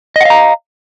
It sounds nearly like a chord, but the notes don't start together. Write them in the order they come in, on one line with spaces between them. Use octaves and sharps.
D#5 F#5 F5 A#5